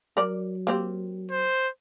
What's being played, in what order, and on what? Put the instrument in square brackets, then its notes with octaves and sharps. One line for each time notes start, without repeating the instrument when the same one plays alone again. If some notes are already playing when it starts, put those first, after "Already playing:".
[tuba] F#3 [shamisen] A#4 D5
[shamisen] A#3 C4 G4
[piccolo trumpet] C5